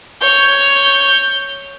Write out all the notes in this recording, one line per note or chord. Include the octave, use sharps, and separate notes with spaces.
C#5 G6